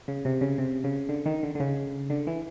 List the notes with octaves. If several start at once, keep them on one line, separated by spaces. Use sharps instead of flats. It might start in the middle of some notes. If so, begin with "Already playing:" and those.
C#3
C3
C#3
C3
C#3
D3
D#3
D3
D3
C#3
D3
E3